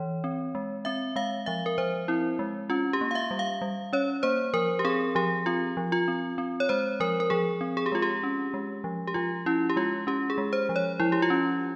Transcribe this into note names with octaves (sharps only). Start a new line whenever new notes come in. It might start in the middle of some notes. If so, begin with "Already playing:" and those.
Already playing: E3 C#5
C4
G#3
C4 E5
G#3 F5
F3 E5
A#4
F3 C5
C4 E4
G#3
C#4 F4
G4
A#3
F5
E5
G3
F5
G3
C#4 C#5
A#3 C5
F3 A#4
G4
C4 G#4
F3 G4
C4 F4
F3
F4
C4
C4
C#5
G#3 C5
F3 A#4
A#4
F3 G#4
C4
G#4
G4
G#3 F4
G4
C#4
G#3
F3
G4
F3 F4
C#4 E4
G4
G#3 F4
C#4 G4
G#4
G#3
C5
F3
C#5
F3 E4
G4
F4
C#4